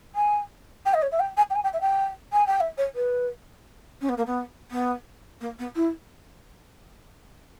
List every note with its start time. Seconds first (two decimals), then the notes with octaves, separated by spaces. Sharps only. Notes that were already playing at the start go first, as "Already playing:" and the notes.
0.15 G#5
0.85 G5
0.94 D#5
1.02 C#5
1.11 E5
1.20 G5
1.37 G#5
1.50 G5
1.55 G#5
1.64 G5
1.73 E5
1.81 G5
2.32 G#5
2.47 G5
2.60 E5
2.77 C#5
2.95 B4
4.01 C#4
4.09 B3
4.17 A#3
4.26 B3
4.71 B3
5.41 A#3
5.59 B3
5.75 E4